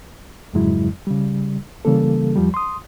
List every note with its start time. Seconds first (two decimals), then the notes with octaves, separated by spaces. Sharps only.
0.54 F2 G#2 C#3 F#3 G#3 E4
1.07 C#3 G3
1.85 C#3 E3 G3 A#3 A4
2.36 E2 F3 G3
2.54 C6 D#6